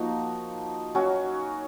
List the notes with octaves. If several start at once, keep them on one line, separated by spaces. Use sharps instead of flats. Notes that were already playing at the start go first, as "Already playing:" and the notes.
Already playing: F3 A#3 D#4 F#4
F#3 C#4 F#4